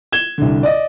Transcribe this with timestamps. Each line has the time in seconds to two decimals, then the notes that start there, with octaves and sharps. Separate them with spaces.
0.12 G#6 E7 G7
0.38 C2 D3
0.63 D5 D#5